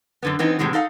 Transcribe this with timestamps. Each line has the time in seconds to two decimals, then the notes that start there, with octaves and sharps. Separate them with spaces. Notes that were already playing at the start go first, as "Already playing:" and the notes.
0.23 F#2 D3 B3
0.39 E3 B3 C4 D#4
0.59 A2 C3 E3 F#3 G#3
0.73 D#4 A4 F5 F#5